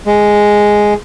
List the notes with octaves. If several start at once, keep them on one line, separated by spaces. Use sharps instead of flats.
G#3